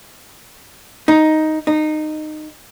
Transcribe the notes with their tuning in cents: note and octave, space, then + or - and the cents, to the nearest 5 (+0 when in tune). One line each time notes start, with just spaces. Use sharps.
D#4 +5
D#4 -20